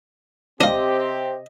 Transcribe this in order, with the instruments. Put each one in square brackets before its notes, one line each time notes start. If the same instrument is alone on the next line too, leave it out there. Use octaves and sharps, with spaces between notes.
[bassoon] C3 [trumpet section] C4 G4 [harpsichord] D4 F5 [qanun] D#5